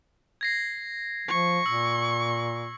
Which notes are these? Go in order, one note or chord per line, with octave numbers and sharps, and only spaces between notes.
G#6 A#6 C7
F3 C#6
A#2 E6